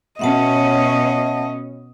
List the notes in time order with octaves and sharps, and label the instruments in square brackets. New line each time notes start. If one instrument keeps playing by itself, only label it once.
[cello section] B2 C#4 [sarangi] D#5 [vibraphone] E5 F#5 A5